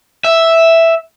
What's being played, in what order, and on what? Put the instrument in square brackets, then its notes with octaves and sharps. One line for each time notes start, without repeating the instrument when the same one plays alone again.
[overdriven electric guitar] E5